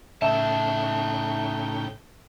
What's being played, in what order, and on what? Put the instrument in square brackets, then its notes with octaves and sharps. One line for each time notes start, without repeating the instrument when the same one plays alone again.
[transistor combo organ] A2 C#3 G5 [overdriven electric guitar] D#4 A5 [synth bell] E5